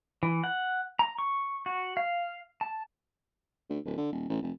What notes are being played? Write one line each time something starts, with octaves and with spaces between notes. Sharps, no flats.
E3
F#5
A#5
C#6
F#4
F5
A5
D2
D1
D3
D#1
A1
F1